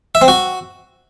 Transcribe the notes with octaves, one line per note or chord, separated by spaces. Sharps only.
E5
C4
F#4